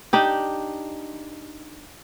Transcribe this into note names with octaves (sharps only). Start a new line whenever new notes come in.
D4 D#4 G4